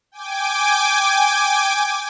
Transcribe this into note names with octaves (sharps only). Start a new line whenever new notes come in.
G5 G#5 D6